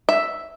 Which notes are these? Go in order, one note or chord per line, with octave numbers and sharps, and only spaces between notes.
E5